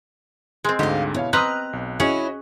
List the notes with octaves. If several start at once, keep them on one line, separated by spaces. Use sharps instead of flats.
G#3 C4
D2 G#2 D3 G4 D#5 F5
B2 E4 C#5 F5
C4 B4 D#5 A#5 D#6 F6 F#6
B1
C#4 E4 F#4 G#4 C#5 D#5